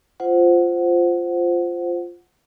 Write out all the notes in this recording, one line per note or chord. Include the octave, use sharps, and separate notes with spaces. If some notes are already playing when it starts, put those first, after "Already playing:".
F4 C5 F#5